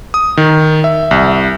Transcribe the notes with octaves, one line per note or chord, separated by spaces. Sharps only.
D#6
D#3
E5
C2